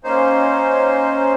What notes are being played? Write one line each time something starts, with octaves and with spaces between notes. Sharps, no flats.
A#3 C#4 D#4 C5